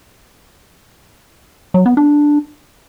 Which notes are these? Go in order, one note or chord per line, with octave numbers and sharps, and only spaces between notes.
F#3
B3
D4